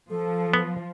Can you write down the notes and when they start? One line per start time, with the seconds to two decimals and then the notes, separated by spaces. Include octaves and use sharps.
0.10 F3 A4
0.54 B3